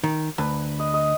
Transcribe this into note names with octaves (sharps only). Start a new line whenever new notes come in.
D#3
D2 B4
D#5
D#5